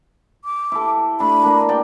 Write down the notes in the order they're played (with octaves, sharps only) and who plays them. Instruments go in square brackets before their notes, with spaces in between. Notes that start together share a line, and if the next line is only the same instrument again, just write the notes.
[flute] D6
[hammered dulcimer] E4 A4
[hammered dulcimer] A3 D4 [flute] B5
[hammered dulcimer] A#3 D4 A#4
D5 G5